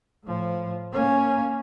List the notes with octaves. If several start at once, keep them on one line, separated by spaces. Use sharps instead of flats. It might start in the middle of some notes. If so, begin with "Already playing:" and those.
A2 F3
A#3 C#4